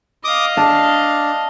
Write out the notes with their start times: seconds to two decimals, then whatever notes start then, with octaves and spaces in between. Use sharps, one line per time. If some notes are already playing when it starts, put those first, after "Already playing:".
0.24 D#5 F5 D6 D#6
0.57 D4 A5